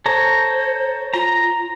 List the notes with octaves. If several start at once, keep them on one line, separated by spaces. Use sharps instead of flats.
A4 C5 C#5 A#5
F4 A#5